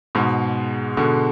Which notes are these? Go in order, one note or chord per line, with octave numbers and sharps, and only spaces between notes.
G#2 B2
B2 D3